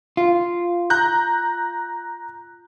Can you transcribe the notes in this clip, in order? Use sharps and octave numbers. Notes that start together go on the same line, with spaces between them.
F4
A#5 F#6 G6